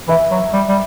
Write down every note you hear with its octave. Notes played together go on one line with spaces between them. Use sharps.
E3 E5
F#3
G3
G3